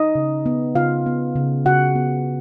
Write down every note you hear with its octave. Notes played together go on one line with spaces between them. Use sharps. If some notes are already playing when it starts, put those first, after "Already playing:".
Already playing: D#4 D#5
C#3
B3
C#3 F4 F5
B3
C#3
C#3 F#4 F#5
B3